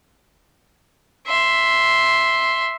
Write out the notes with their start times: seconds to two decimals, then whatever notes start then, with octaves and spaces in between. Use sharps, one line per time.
1.27 E5 C6